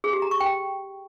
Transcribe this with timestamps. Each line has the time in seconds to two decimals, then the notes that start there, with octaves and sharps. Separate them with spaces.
0.04 G#4
0.13 G4
0.22 A#5
0.31 C#6
0.40 G5